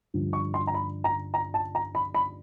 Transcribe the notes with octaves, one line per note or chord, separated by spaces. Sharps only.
G2 D3 F3
C#6
C6
A#5
B5
A#5
A#5
A5
A#5
B5
B5